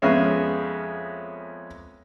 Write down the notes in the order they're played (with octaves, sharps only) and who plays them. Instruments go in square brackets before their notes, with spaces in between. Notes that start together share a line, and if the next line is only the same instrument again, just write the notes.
[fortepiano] F2 G#3 B3 C#4 E5 F5